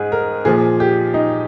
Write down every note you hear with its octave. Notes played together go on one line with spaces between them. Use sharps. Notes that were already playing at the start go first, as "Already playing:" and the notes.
Already playing: G#2 G#4
A#4
A#2 F3 G#4
G4
D#4